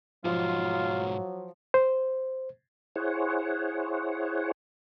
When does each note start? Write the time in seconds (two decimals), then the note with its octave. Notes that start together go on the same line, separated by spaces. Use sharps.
0.25 B1 G#2 F3 F#3 F4
1.74 C5
2.96 E4 G#4 C5 C#5 F#5